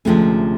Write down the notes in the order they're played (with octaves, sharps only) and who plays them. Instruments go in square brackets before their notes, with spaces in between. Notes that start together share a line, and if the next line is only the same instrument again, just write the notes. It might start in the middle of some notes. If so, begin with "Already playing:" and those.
[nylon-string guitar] D2 C3 F3 G#3 C#4 [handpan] A3